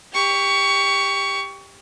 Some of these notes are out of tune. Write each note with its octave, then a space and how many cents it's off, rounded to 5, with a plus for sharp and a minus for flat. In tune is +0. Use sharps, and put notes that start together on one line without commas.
G4 +15 C#6 +20